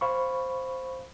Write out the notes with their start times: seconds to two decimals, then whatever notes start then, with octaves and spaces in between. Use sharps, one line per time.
0.01 C5 F5 B5 C#6